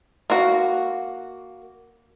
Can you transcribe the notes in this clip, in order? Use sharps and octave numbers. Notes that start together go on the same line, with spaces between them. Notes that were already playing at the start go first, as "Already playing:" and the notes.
A#3 F#4